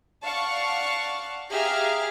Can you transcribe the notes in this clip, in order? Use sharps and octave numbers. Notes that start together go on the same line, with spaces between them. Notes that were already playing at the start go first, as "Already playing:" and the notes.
D5 F5 F#5 A5 C#6
G4 G#4 E5 F5 A#5 F6